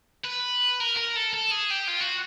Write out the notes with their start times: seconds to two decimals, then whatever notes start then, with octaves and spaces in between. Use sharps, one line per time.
0.24 B4
0.80 A#4
0.97 A#4
1.16 A4
1.34 A4
1.51 G#4
1.71 G4
1.89 F4
2.02 F#4